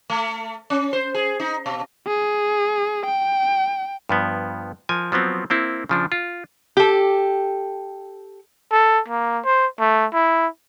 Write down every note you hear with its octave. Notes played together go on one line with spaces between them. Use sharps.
A3
C#4
C5
G#4
D#4
B2
G#4
G5
G2 F3 B3
F3 A#4 G#5
F3 F#3 B3 C4
A#3 C4 E4
C#3 F3 D4
F4
G4 A4
A4
A#3
C5
A3
E4